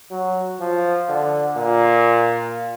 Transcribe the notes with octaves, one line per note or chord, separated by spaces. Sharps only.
F#3
F3
D3
A#2